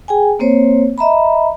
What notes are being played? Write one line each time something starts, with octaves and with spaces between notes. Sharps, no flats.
G#4 G5 G#5
A#3 C4 C5 C#5
D#5 E5 A#5 B5